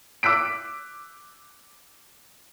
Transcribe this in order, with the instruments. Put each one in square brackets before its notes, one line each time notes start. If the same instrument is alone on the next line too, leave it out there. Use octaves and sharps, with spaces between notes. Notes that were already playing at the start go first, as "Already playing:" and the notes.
[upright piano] D6 E6 F#6 B6 D7